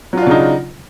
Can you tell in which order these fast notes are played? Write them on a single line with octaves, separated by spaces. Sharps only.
F#3 F4 D4 C#3 D#4